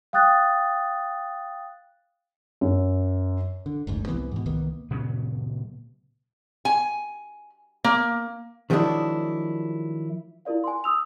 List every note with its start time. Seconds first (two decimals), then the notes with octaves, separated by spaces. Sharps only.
0.13 F5 G5 D#6 F#6 A6
2.61 F#2
3.66 D3
3.87 F#1 D2 G#2
4.07 C2 C3 E3 B3
4.31 G#2 B2
4.46 C2 D#3 A#3 B3
4.90 A#2 C#3 F#3 B3
6.65 G#5
7.84 A#3
8.70 D#3 F3 F#3 G#3 D4 E4
10.45 E4 F4 A#4 D5 F5
10.64 G#5 C6
10.84 D#6 E6 F7